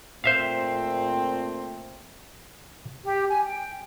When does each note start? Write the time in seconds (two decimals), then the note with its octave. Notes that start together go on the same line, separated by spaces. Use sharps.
0.24 A#2 A3 C4 C5 E5 F5
3.03 G4
3.29 G#5
3.45 G5